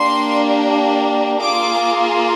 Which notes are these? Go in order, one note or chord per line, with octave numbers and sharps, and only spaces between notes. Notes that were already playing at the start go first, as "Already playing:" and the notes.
Already playing: A#3 D4 G4 C6
A#3 F4 G#4 D6